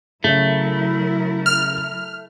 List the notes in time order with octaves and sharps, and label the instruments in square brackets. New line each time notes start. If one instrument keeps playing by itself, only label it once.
[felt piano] C#3 E5 [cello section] F#3 E4 A#4 [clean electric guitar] A3
[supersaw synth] F6